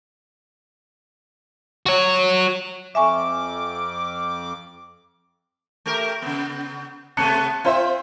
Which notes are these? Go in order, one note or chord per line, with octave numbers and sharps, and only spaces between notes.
F#4 C#5
F2 E5 G#5 C#6 D6
A3 G4 A#4
C#3 B3
C3 A3 B3 A5 F#6 C#7
C4 F4 C5 E5